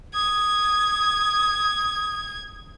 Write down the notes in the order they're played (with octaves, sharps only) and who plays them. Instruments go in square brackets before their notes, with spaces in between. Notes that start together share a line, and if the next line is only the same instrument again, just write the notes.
[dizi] D#6 [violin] G#6